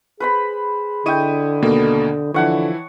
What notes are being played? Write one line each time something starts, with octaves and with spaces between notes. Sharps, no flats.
G#4 B4 C5 B5
D3 E4 D#5 G5 C#6 D#7
D#2 B2 A#3 A4
D3 E3 F3 E4 C#5 F#5 A5